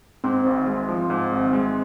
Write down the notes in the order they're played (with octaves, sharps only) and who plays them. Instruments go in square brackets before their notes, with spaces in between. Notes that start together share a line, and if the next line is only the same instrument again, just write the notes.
[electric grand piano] G#2 [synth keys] C4
[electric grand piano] G#1
G#3
F3
G#2
G#1
G#3